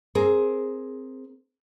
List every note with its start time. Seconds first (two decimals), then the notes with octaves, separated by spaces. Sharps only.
0.15 C4 G#4 A#4